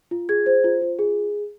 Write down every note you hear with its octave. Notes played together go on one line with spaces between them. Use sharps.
F4
G#4 G#6
C5
F4
F4
G#4